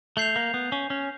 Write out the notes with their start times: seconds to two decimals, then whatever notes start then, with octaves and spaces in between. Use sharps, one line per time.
0.17 A3 G6 C7 F7
0.36 A#3
0.54 B3
0.72 C#4
0.90 C#4